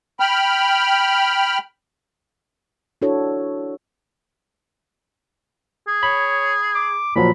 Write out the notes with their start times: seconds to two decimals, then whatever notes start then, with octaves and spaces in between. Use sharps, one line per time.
0.20 G5 B5 F6
3.02 D4 E4 F#4 A4 C#5
5.88 G#4
6.03 C#5 B5
6.75 D6
7.16 A#2 F3 F#3 B5